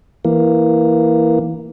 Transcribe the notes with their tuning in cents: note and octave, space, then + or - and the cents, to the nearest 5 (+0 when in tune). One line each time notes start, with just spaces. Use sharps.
E3 -5 A#3 +0